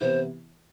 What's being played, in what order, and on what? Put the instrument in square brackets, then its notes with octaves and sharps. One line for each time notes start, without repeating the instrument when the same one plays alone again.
[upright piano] C3 E3 B3 E4 [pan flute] C5